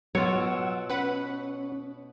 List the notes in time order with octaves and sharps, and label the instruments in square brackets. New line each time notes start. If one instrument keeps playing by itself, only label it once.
[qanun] B2 [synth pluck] F#3 [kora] F4 C#5 [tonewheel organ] F#5 E6
[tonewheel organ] C#4 [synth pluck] B4 F#5 B5